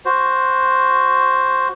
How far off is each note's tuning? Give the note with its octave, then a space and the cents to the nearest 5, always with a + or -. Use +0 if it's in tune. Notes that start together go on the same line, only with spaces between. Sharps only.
F#4 +0 C5 +0